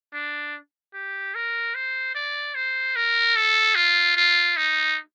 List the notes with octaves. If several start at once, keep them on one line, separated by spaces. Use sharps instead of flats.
D4
G4
A#4
C5
D5
C5
A#4
A4
F4
F4
D#4